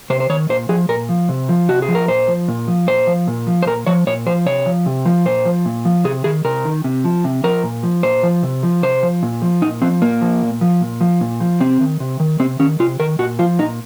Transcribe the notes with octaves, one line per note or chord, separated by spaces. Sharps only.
C3 C5
C5
D#3 C#5
A#2 C5
F3 G#4
A#2 A#4
F3
C3
F3
C3 F#4
G#4
F3
A#4
A#2 C5
F3
A#2
F3
A#2 C5
F3
A#2
F3
C5
A#2 A#4
F3 C#5
A#2 C#5
F3 C5
C3 C#5
F3
C3
F3
A#2 C5
F3
A#2
F3
C3 G#4
D#3 G#4
C3 A#4
D#3
C3
F3
C3
F3 A#4
A#2
F3
A#2 C5
F3
C3
F3
C3 C5
F3
A#2
F3
A#2 D#4
F3 C4
A#2 A#3
F3
A#2
F3
A#2
F3
A#2
F3
C3 C4
D#3
C3
D#3
C3 C4
D#3 C#4
C3 F4
D#3 A#4
A#2 F#4
F3 F4
A#2 D#4